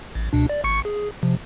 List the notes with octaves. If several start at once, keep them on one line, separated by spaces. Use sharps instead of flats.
A1
C#2 B2 D4
D5
G#1 C#6 C#7
G#4
C3 F3